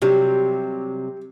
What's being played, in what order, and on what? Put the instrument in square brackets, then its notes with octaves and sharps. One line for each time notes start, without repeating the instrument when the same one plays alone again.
[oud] C3 F#3 G3 [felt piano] G4